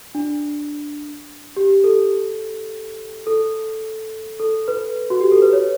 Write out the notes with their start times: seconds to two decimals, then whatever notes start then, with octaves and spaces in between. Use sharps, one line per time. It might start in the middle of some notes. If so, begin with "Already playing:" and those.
0.15 D4
1.57 G4
1.84 A4
3.27 A4
4.40 A4
4.68 B4
5.10 F#4
5.21 G4
5.32 A4
5.42 B4
5.53 C#5